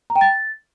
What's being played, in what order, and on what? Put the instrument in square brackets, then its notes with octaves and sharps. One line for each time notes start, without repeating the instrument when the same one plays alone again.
[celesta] A#5
G5
A6